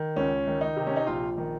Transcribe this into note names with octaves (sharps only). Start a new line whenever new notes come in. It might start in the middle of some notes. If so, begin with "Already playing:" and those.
Already playing: D#3
C#2 C#4
D#3
D#4
C3
C#4
D#4
A#1 F4
D#3